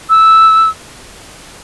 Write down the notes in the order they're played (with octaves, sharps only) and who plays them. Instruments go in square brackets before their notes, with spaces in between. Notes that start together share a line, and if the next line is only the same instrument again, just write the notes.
[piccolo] E6